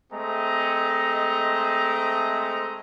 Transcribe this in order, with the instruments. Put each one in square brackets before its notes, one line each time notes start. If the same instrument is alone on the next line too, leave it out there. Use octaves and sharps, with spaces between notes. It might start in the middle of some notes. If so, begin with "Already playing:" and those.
[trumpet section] G#3 A3 C4 D#5 A#5